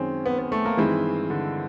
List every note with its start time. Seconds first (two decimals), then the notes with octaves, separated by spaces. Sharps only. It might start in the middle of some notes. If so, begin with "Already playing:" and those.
Already playing: F#2 D#3 G#3 C4 C#4
0.26 B3
0.39 B3
0.52 A3
0.65 A#3
0.77 G2 D#3 E3 G#3 C4 E4
1.30 D3